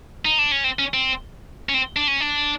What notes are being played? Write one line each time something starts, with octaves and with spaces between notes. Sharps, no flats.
D#4
D4
C#4
C4
C#4
C4
C#4
C4
D4
C#4
D4